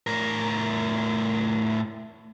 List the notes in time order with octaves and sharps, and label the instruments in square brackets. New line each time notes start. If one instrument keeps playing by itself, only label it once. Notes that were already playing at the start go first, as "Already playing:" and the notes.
[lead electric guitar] A2 A#4